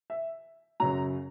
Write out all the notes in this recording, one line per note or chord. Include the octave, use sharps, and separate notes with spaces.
E5
F#2 C#3 F#3 A#5